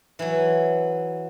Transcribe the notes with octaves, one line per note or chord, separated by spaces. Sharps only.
E3 F#3